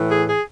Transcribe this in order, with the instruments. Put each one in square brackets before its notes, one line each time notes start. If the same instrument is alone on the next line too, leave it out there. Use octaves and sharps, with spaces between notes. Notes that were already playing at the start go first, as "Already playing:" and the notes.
Already playing: [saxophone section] A2 E3
G#4
G#4